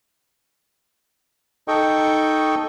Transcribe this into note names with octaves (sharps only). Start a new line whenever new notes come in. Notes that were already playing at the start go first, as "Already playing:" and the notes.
D#4 A4 D#5 G5 C#6